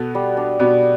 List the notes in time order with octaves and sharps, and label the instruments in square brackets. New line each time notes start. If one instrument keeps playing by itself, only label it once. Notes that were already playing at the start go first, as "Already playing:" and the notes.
Already playing: [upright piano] B2 B3 [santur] A4
[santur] G3
D4
[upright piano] B2 B3 [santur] G3